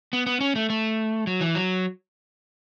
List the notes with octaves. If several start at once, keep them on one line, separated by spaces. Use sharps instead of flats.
B3
B3
C#4
A3
A3
F#3
E3
F#3